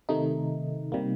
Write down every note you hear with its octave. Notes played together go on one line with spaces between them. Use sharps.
C3 D#3 A3 D#4
C3 G3 A#3